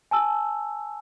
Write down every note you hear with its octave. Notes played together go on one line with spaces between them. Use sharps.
G#5 A5 E6